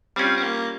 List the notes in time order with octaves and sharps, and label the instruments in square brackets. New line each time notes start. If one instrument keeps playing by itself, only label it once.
[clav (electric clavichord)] G3 C#4 F4 [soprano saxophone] C4
[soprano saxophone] C4
A#3